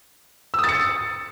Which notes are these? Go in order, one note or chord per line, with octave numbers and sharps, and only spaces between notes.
D#6 E6 A6 C#7